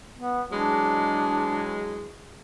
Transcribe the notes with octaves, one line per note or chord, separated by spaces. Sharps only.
B3
E3 F#3 G#3 D4